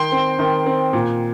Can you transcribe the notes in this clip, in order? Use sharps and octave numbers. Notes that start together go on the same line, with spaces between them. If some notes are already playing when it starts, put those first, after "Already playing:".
Already playing: D#3 G5 C6
C4
D#3
C4
A#2